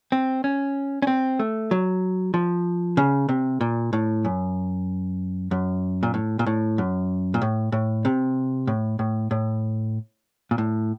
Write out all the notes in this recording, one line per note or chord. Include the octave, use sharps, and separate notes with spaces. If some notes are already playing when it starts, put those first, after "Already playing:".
C4
C#4
C#4
C4
A3
F#3
F3
C#3
C3
A#2
A2
F#2
F#2
A#2
A2
A#2
A2
F#2
A#2
A2
A2
C3
A2
A2
A2
A#2
A2